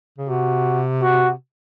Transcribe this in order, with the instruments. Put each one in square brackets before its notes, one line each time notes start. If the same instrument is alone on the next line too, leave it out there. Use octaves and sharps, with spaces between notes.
[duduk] C#3
[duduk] C3 [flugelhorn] F#4
[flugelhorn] F#4